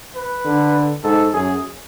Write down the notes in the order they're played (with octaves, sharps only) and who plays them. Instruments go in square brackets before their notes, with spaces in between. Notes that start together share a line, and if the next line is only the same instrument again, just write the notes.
[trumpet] B4
[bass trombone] D3
[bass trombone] G#2 [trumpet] A4
[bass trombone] F#2 [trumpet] G#4